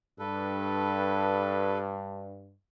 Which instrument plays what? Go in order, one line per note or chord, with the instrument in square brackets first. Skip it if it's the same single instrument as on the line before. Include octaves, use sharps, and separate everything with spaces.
[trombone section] G2 [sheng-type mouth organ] A4 B4